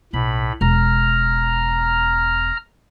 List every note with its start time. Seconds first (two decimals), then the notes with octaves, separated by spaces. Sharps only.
0.13 B1 A2 B5
0.61 E1 A#5 F6